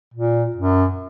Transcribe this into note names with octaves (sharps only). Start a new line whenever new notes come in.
A#2
F#2